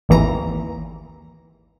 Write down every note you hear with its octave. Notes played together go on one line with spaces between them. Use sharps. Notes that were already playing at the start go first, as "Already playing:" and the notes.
G#1 D#2 E3 A#5